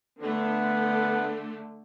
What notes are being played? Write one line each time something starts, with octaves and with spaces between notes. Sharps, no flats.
D3 A3 B3